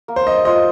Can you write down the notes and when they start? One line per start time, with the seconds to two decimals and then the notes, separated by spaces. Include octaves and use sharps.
0.08 A#3
0.16 C5
0.27 D#5
0.45 F4 C5 D#5